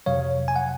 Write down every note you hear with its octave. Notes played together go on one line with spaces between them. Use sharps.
F2 C3 F#3 C#5 F5
G#5
F#5